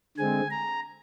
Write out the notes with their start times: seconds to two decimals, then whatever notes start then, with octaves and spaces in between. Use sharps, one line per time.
0.18 D3 G#3 C4 G#5
0.50 A#5